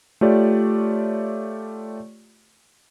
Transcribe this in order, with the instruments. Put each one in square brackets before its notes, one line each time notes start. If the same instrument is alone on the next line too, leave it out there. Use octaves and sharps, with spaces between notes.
[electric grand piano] A3 F4 G4 C#5 D5